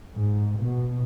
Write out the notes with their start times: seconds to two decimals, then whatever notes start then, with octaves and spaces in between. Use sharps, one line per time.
0.16 G#2
0.60 B2